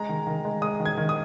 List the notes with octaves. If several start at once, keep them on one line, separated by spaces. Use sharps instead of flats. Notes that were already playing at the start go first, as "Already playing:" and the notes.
Already playing: G#3 A#5
D#3
D#3
G#3
G#3 D#6
D#3
G#6
D#3
D#6